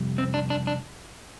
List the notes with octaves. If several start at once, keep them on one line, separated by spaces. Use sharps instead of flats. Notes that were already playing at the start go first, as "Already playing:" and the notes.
Already playing: F2 C3 G3
C4
D4
D4
D4